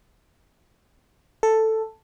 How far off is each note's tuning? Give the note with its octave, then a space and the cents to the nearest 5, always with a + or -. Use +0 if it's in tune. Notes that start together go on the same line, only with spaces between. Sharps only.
A4 +5